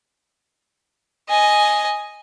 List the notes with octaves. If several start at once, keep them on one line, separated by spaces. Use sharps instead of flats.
D#5 G#5